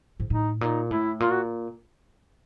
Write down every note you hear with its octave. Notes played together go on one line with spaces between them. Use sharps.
G#2
A2 D#4
A#2 D#4
A2 E4
A#2 F4
F#4